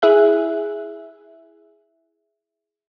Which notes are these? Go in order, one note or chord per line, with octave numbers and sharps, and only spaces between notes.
E4 G#4 E5 F#6